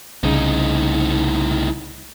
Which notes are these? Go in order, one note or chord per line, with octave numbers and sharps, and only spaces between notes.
C2 A2 C#3 D#4